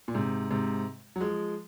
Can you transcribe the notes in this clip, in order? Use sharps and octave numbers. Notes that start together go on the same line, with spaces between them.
A#2
G#2 C3
G#2 C3
F#3
F3 G#3